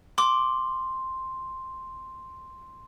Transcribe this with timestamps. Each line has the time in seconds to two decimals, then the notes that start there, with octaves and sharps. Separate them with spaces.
0.18 C6 D6